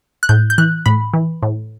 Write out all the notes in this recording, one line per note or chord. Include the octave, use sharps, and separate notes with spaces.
F#6
A2 G6
G6
E3 F#6
A2 B5
E3
A2